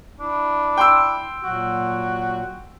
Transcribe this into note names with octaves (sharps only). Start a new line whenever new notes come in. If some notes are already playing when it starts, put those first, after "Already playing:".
D4 E4
G5 C6 E6
A#2 F#3 F#4